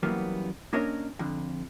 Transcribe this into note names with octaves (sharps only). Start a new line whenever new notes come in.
F#2 E3 F#3 G3 A#3 B3
A#3 C#4 D4 A#4 C#5 D#5
F2 D3